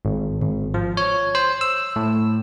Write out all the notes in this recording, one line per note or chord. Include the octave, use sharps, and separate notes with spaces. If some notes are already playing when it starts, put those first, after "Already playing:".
G#1
G#1
F3
C#5
C5
E6
A2